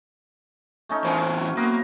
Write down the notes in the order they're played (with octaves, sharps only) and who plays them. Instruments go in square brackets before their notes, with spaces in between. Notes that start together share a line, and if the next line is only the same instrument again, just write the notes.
[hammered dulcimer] A3 C#4 D#4
[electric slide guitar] A2 E3 C5 [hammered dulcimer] C4 C#4 E4
[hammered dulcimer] F#3
[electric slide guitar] A#3 [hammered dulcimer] B3 A#4 C5